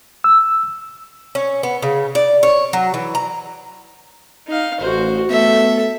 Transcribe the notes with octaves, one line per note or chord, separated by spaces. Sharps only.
E6
C#4
B3
C#3
D5
C#5
F#3
E3
A#5
D#4 F5
A1 F#4 C5
A3 B3 A4 E5